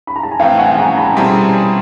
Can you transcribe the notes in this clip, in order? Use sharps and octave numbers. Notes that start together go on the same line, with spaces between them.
B5
A#5
A5
G#5
A2 E3 A3 C4 F5 G5
F#5 G#5
G#5 A#5
A5 B5
B2 G3 C4 E4 G#4 A#5 C6